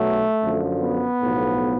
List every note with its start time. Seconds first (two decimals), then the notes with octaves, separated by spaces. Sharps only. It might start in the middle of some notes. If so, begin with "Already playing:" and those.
Already playing: B1 B2 F#3 A3
0.42 F#2 D3 F3
0.82 B3
1.21 B1 A2 F3